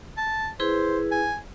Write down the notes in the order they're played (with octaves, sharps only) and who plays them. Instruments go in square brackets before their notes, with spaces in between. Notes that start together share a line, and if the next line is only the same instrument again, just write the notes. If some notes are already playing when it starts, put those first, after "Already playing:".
[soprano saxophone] A5
[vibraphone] E4 G#4 B4 [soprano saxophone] C5
[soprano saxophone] G#5